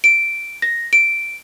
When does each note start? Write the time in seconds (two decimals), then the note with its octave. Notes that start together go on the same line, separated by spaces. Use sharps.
0.04 D7
0.62 A#6
0.93 D7